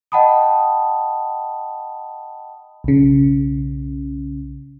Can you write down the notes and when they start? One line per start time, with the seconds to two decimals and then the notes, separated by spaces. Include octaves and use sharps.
0.12 D#5 F#5 G5 A5 B5 D#6
2.84 B1 C#3